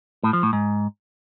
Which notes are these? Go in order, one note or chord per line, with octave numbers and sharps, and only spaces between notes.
A2
F3
A2
G#2